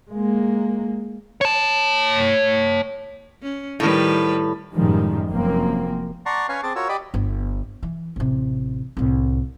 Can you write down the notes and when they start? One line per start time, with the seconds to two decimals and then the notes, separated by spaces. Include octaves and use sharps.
0.11 G#3 A#3
1.41 C#5 A5
3.42 C#4
3.80 A2 D#3 G3 B4
4.73 F#2 A2 D#3 F3 G3 G#3
5.30 F1 F#2 A#3 C4
6.26 D5 F#5 A5 A#5 C6 C#6
6.49 C#4 B4 C#5 F5 G#5 C#6
6.63 C4 G#4 A5 D6
6.76 F4 F#4 A#4 C#5 E6
6.89 G4 D5 D#5 B5
7.14 G1
7.83 E3
8.16 A1 C3
8.97 C2 A2